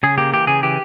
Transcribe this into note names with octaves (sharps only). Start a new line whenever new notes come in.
C#3 G#4
A#3 G4
E3 G4
C#3 G#4
E3 G4